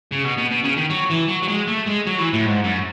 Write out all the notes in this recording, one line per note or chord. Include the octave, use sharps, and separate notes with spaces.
C#3
B2
B2
B2
C#3
D#3
F#3
E3
F#3
F#3
G#3
A3
G#3
F#3
E3
A2
G#2
F#2